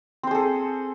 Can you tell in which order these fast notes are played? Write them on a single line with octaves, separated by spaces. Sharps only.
C4 C5 G#4 A4